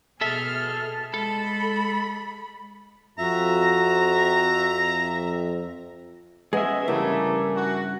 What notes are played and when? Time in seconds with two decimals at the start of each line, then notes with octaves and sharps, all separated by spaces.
0.21 B2 G#4 A4 E5 A5 F6
1.14 G#3 A4 B5
3.18 F2 F#4 E5 A#5
6.53 G#3 B3 C#4 G#4 D#5 E5
6.88 G2 C#3 E3 G3 A3 A#3 E4
7.55 F#4